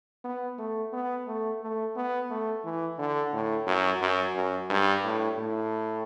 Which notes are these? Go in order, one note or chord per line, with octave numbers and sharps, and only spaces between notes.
B3
A3
B3
A3
A3
B3
A3
E3
D3
A2
F#2
F#2
F#2
G2
A2
A2